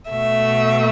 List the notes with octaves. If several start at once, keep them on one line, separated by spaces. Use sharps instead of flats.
B2 A3 E5